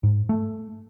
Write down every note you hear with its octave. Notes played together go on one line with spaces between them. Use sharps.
G#2
A3